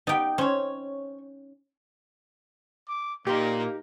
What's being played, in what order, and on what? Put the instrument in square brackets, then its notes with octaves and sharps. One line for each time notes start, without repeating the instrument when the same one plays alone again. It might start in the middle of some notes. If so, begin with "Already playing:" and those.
[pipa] B3 G4 [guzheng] D#4 G5
[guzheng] C#4 [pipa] C5 C#5
[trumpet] D6
[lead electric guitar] A#2 C6 [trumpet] A#3 [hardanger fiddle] D#4 A#4 [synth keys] G4